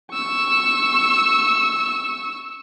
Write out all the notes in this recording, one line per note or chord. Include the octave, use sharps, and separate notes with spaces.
C#6 E6